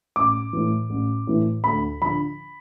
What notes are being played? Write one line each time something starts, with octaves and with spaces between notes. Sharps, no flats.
A1 D6
A2 E3
A1
A2 E3
D2 B5
D3 F3 B5